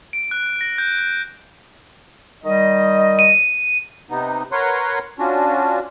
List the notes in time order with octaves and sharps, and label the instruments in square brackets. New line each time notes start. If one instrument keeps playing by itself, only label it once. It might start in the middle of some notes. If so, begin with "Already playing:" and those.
[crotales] D7
F#6
A#6
G6
G6
[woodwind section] D#3 G3 D#5
[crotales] D#7
[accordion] C3 B3 D#4
A#4 B4 C#5 F#5 C6
C#4 D4 F4 F#4